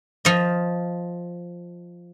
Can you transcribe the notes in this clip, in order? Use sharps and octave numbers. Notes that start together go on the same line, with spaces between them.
F3 D#5